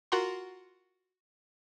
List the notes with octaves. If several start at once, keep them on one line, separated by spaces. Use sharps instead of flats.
F4 F#4 A#4 F#5 A#5 C6